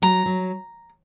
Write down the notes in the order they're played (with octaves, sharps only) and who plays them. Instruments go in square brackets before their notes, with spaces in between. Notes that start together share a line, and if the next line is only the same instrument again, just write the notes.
[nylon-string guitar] F#3 [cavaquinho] A#5
[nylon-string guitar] F#3